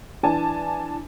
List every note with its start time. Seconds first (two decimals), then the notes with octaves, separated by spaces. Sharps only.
0.23 E3 D4 G#5 A5